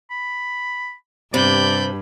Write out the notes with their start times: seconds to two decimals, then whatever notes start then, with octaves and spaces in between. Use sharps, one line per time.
0.11 B5
1.34 G2 C3 D5 B5 G6